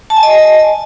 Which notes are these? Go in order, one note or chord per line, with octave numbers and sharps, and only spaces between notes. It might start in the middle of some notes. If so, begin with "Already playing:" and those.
A5
G#5
D#5